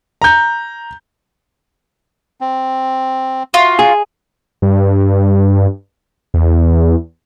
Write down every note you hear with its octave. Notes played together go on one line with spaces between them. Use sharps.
A#5 G6
C4
F4 F#4
G#4
G2
E2